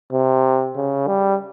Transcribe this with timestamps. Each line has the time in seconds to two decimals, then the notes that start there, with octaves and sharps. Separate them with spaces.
0.12 C3
0.76 C#3
1.07 G3